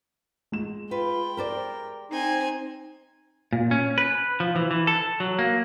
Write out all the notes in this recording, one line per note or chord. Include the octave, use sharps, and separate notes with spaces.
G#3 E7
F4 B4 G5
G4 A#4 C5 D5
C4 D#4 G#5
A#2
C#4
B4
F3
E3
E3
A4
F#3
A#3